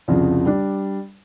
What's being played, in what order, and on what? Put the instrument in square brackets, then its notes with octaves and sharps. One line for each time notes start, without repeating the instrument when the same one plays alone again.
[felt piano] C2 F2 C#3 F3
G3 D4